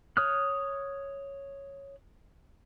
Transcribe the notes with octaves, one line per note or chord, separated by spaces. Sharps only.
C#5 D#6 F6 F#6